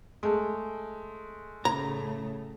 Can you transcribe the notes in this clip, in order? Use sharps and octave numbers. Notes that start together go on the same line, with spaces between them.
G#3 A3
A2 C#3 A3 A#5